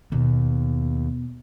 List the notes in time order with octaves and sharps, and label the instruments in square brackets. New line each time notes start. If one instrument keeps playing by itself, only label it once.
[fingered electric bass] D#2 [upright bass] B2